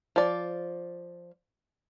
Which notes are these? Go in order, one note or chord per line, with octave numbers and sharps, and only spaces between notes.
F3 D5